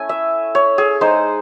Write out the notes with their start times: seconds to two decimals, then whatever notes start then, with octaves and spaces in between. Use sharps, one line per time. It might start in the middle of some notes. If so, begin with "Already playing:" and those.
Already playing: A3 C#4 E4 G#5
0.09 E5
0.55 C#5
0.78 G#4
1.01 G#3 D#4 C5